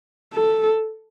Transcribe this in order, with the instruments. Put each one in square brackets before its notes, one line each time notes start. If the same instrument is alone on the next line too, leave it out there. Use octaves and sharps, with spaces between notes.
[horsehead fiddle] A4